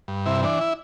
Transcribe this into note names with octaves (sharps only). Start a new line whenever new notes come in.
G2
C3 E4
E3 D4
E4